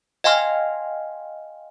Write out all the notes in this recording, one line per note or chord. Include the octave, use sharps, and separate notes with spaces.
D#5 F5 G5 G#5 C6 F6